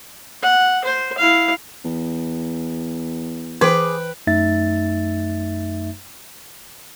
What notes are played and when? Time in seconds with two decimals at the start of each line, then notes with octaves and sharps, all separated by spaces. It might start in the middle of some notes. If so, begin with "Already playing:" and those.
0.43 F#5
0.85 C5
1.18 E4 F5
1.85 E2
3.61 E3 G#4 B4 G5 D6
4.27 F#2 A3 D#4 E5 A6